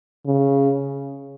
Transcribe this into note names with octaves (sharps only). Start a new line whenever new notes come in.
C#3